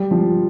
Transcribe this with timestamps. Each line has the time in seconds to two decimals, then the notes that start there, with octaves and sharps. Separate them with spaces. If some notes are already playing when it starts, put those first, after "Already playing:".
Already playing: G3
0.11 F3